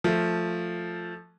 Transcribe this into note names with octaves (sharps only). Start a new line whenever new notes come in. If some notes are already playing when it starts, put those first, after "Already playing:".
F3 A3